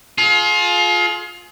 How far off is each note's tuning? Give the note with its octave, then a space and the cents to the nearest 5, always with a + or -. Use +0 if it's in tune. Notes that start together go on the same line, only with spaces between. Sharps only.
F4 +20 G#4 +40